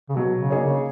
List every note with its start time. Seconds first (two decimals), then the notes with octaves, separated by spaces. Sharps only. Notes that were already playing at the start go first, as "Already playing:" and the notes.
0.09 C#3
0.16 B2 F#3
0.39 C#3
0.50 A#3 D#4 G#4 C#5
0.62 C#3